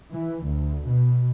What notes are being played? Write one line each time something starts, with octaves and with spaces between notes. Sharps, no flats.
E3
D2
B2